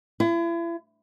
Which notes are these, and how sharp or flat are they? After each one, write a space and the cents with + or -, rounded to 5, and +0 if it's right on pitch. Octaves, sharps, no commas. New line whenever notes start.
E4 +40